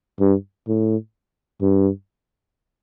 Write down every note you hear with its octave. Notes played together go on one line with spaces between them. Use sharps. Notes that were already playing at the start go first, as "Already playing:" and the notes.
G2
A2
G2